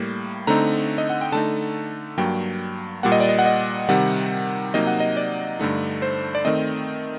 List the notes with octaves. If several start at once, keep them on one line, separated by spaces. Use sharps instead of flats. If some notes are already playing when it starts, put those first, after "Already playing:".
Already playing: A2 G3 A#3
D3 A3 C4 D#4 A#5
D#5
F#5
G5
D3 A3 D#4 A5
G2 F#3 A#3 G5
A#2 G3 A#3 F#5
D#5
D5
D#5
F#5
D#5
C3 D#3 G3 F#5
C3 F#3 A#3 D#4 D#5
F#5
D#5
D5
G2 D3 A3 D#4
C5
D5
D#3 A3 C4 D#5